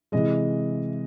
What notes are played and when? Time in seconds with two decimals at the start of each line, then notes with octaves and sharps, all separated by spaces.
0.12 C3 E3 G#3 D#5